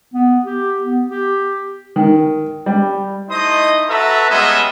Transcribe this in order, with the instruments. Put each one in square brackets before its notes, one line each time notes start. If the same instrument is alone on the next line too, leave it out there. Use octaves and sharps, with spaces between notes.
[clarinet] B3
G4
B3
G4
[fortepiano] D#3
G3
[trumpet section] A3 D#4 E4 C5 D#5 D#6
F#4 A4 B4 E5 A5 A#5
G3 G#3 B3 C#4 D#5 E5